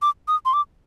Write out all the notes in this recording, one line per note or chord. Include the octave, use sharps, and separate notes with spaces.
D6
D#6
C6
D6